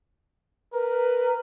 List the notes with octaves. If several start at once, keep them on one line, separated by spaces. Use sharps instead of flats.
A#4 B4